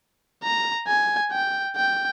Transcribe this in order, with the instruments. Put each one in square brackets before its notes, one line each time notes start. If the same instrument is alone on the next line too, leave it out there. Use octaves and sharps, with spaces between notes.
[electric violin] A#5
G#5
G5
G5